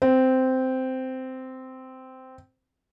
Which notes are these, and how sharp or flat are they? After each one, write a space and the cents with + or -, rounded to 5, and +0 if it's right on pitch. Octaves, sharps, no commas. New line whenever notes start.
C4 -10